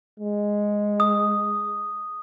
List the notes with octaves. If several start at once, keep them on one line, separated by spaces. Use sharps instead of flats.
G#3
D#6